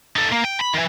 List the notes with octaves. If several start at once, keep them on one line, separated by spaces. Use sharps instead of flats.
D#4 A4
A#3
G5
B5
D#3 E3